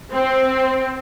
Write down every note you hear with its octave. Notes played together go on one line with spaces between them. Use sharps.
C4